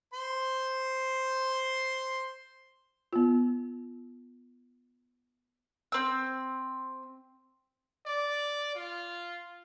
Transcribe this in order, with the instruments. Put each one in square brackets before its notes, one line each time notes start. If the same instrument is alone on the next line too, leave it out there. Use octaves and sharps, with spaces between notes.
[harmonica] C5 C6
[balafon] B3 F4
[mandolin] C4 E6
[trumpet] D5
F4